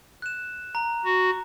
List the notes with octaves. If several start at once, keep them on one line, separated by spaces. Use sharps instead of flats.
F#6 E7
A#5
F#4